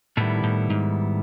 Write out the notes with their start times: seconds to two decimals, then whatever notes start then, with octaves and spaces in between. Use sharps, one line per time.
0.17 A2 D#3 G3 B3 E4 A4
0.43 A2
0.70 G#2